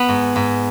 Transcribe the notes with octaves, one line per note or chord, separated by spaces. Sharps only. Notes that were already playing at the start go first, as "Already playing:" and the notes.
Already playing: B3 B4
G#2
G#2